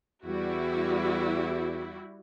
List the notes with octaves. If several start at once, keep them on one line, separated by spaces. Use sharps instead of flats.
E2 G3 E4 F#4